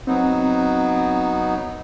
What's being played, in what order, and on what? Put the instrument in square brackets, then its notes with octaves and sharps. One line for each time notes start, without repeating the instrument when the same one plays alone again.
[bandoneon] F#3 B3 D#4 [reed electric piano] C4